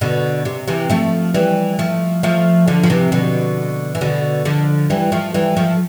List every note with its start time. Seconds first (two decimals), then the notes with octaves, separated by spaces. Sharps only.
0.01 B2 D3
0.45 C3
0.68 C3 E3
0.90 F3 A3
1.34 E3 G3
1.79 F3 A3
2.23 F3 A3
2.67 D3 F3
2.83 F3
2.90 C3 E3
3.12 B2 D3
3.95 E3
4.01 B2 D3
4.45 D3 F3
4.90 E3 G3
5.12 F3 A3
5.34 E3 G3
5.57 F3 A3